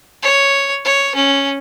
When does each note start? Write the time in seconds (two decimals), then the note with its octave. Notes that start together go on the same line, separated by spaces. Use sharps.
0.23 C#5
0.85 C#5
1.15 C#4